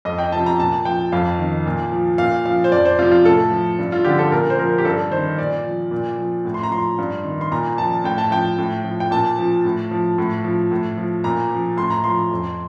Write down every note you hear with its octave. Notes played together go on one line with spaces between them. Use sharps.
F2 D#5
G5
C3 F3 A5
A#5
A#2 A5
F3 G5
F2 F5
D#3
A#2
F3
A#2 F5
F3 F5
C5
F2 D5
C5
C3 F3 F4
F4
A2 A4
F3
G2
F4
D3 F3 G4
A4
A#2 A#4
C5
F3 A#4
G4
G2 A4
D#3 C5
A#2 D5
F3
A#2
F3
A2
C6
A#5
F3 C6
G2
D#3
C6
A#2 A#5
F3 A5
A2 G5
A5
F3 G5
A2
F3
G5
A#2 A5
F3
A2
F3
A2
F3
A2
F3
A#2 A#5
F3
A2 C6
A#5
F3 C6
F2